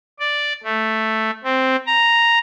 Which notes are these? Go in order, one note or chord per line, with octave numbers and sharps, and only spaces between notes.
D5
A3
C4
A#5